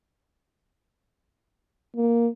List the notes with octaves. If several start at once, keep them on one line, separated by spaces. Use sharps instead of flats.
A#3